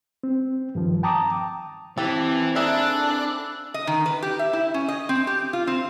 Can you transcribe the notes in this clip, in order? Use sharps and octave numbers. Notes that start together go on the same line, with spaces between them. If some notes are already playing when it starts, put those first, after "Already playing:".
C4
G2 D#3 F3
G5 A5 A#5 D6 D#6
E3 C4 G4 A4
A#3 D4 E4 G#4 A4 F#6
D#5
D#3
B4
G4
E5
E4
C#4
D#5
C4
G4
F4
C4